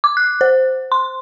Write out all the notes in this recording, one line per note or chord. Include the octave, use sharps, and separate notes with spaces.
D6
F#6
C5
C6